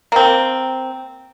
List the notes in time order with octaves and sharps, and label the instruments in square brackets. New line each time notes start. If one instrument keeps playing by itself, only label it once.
[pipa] A#3 C4